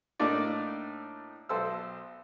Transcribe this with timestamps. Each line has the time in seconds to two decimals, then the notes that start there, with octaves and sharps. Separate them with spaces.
0.20 A2 A3 A#3 D4 D#4 D5
1.49 B1 A4 C5 E6